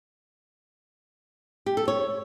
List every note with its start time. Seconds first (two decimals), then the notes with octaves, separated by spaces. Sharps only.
1.66 G4
1.77 A4
1.88 C#5